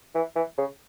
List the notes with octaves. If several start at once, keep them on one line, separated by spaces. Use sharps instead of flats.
E3
E3
C#3